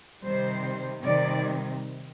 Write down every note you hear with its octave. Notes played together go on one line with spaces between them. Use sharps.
C3 D#3 G3 C5
C3 D#3 G3 D5